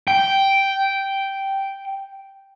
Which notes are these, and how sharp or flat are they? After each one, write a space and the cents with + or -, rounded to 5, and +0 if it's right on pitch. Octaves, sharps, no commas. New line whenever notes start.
G5 -5